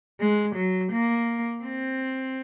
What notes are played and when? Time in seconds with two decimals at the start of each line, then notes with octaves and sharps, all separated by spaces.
0.20 G#3
0.56 F#3
0.93 A#3
1.63 C4